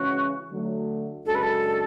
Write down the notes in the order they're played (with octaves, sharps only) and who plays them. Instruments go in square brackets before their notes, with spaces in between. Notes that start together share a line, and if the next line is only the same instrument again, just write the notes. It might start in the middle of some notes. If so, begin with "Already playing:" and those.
Already playing: [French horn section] C#3 E3 G#3 C#4 [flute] F#4
[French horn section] D3 F#3 A3
[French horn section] F#2 C#3 G#3 D4 F#4 [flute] A4
[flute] B4
A4